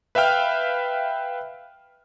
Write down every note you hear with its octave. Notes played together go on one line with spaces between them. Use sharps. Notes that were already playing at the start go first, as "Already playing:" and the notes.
B4 E5 F5 G5 F6